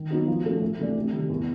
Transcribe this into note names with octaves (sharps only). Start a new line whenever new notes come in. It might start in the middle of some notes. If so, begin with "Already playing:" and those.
Already playing: D#3
F#3 B3 D#4 F#4
F3
A3 C#4 F#4 A4
D2
C3 E3 A3 D4
C3
D#3 G3
E2